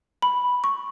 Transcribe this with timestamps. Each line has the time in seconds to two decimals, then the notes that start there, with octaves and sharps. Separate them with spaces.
0.22 B5
0.64 C#6